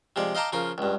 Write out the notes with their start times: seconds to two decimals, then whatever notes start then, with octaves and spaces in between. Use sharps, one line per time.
0.16 C3 F3 G#3 D5
0.35 D#5 F5 G5 A5 A#5 D6
0.53 C#3 F3 F4 A#4
0.78 C#2 G2